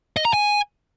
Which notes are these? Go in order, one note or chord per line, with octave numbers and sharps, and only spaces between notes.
D#5
A#5
G#5